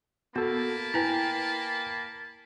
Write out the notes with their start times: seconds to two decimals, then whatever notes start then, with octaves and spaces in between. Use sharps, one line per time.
0.36 A#3 B3 F#4 A4 A5 B5
0.94 E4 B4 G5 G#5 A#5